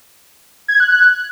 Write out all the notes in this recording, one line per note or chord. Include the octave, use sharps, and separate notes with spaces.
G#6
F#6
F#6